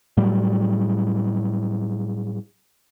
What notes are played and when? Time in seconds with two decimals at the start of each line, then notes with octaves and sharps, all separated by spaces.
0.17 A2 F#3 G3